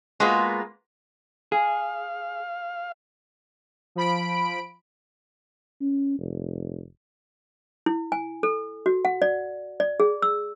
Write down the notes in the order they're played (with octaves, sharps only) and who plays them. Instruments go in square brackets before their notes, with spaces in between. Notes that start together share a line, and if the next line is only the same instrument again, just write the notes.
[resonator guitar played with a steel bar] G#3 A#3 B3 F4 F#4 B4
[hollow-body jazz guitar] G#4 [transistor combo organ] F5
[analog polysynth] F3 B5 D7
[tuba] C#4
F1
[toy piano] E4
G#5
A4
F#4
F#5
D5
D5
G#4
E6